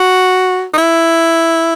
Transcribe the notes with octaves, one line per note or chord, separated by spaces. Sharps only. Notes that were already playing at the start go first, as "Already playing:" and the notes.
Already playing: F#4
D#4
E4